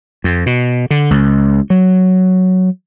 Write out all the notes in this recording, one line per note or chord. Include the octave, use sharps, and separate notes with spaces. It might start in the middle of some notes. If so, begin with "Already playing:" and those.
F2
B2
D3
C#2
F#3